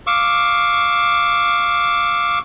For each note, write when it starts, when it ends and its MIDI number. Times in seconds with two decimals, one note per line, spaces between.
0.07 2.39 77
0.07 2.39 85
0.07 2.39 86
0.07 2.39 88